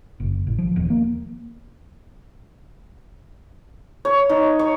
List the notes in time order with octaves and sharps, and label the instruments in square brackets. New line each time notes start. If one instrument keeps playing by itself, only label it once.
[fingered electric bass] F#1
A1
F3
D#1
A#3
[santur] C#5
D#4
C#5